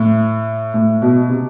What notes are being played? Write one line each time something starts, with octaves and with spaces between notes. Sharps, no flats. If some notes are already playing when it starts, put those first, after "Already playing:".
Already playing: A2
A2
B2
C3